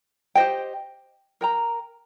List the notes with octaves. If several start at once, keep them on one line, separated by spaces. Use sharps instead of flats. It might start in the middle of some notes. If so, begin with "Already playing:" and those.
G4 C5 D#5 G5
A#4 G5 A#5